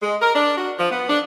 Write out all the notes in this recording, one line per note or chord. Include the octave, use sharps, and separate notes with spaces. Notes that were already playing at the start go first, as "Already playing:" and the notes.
G#3
A#4
D4
F#4
F3
B3
D4